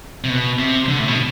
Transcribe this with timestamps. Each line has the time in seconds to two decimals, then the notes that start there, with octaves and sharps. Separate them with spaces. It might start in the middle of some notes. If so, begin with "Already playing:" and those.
0.24 C3
0.30 B2
0.59 C3
0.88 D3
0.99 A2
1.08 B2